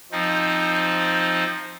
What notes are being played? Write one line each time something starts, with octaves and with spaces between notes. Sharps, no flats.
F3 C4 D#4